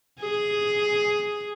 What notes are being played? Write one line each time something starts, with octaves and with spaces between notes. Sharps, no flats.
G#4